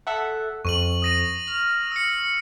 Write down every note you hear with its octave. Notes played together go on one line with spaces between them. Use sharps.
A4 E5 F#5
F2 C#6 D#7 F#7
D#6 A#6 D#7
F6
E6 C#7